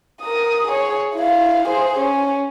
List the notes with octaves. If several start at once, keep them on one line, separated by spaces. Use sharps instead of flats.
A#4 D#6
G#4 C#5
E4 F5
G#4 C5
C#4